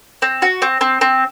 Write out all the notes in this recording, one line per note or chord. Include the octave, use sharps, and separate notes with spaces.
C4
F#4
C4
C4
C4